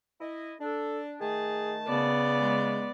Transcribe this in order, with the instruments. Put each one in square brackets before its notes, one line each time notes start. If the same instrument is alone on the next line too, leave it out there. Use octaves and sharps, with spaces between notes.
[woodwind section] E4 D#5
[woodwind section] D4 [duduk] A4
[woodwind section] D#3 A3 A5 [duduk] G#4
[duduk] C#3 [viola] B3 D5
[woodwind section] G#3